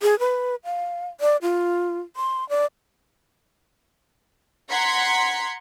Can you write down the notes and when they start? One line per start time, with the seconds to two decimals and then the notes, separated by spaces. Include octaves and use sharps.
0.02 G#4
0.19 B4
0.65 F5
1.21 D5
1.42 F4
2.16 C6
2.49 D5
4.70 F#5 A#5 C6 G#6 B6 C#7